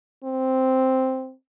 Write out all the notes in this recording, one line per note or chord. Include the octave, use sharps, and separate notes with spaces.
C4